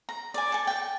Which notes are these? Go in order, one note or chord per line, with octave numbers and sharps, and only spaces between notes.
A#5
D5 G#5
A4 G#5
G5 A5